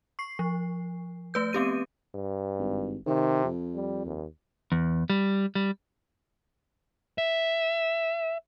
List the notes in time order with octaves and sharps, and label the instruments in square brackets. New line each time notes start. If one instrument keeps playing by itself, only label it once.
[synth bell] C#6 C7
F3
A3 B4 G6
B3 C4 G4 D#7
[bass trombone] G2
[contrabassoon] G#1
[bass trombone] C3 [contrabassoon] D#3
[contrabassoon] F2
[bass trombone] G3
D#2
[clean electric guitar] E2
G3
G3
[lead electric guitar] E5